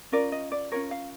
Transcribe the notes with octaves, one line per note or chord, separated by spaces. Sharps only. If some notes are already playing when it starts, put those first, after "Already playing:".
C#4 F4 A#4 D5
D#5
D5
C#4 F4 A#4 C#5
F5